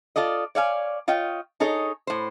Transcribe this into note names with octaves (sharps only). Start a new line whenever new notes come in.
F4 A4 D5 D#5
C#5 D5 F5 G#5
F4 C#5 D#5 G5
D#4 G#4 A4 C#5 D#5
A2 C5